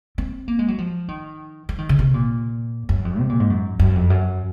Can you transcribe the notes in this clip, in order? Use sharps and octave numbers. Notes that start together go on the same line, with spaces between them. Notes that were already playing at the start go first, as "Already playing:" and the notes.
C4
A#3
G#3
F#3
F3
D#3
F3
D#3
C#3
C3
A#2
F#2
F2
C3
A#2
G#2
F#2
F#2
F2
F#2